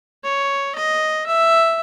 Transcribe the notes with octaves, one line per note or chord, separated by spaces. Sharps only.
C#5
D#5
E5